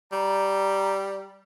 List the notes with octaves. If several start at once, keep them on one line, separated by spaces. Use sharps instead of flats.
G3 A#5